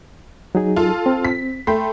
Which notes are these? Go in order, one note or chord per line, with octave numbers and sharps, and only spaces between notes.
F#3 D#4 G#4
F4 A4
C4
B6
A3 G5 B5 C6